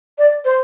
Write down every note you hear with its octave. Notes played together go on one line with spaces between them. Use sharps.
D5
C5